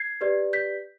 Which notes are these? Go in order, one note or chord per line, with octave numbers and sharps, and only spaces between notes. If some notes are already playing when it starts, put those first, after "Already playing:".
Already playing: G#6 C7
G4 B4 D5
G6 B6